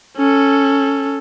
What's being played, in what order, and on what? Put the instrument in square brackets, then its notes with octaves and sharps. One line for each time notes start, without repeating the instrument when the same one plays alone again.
[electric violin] C#4 A4